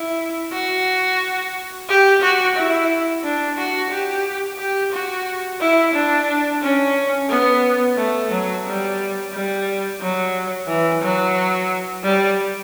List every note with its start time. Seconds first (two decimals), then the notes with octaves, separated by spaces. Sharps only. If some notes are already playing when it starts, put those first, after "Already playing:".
Already playing: E4
0.52 F#4
1.88 G4
2.22 F#4
2.56 E4
3.24 D4
3.57 F#4
3.91 G4
4.59 G4
4.92 F#4
5.61 E4
5.94 D4
6.62 C#4
7.29 B3
7.98 A3
8.31 F#3
8.65 G3
9.33 G3
10.01 F#3
10.68 E3
11.02 F#3
12.03 G3